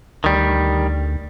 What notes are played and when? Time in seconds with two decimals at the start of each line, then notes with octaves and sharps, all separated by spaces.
0.24 D2 D#3 G3